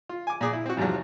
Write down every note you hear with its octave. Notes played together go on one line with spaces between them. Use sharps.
F4
G#5 D6
A#2 G#4 D6
E4
C4 F#4
E2 G#2 C3 F3 F#3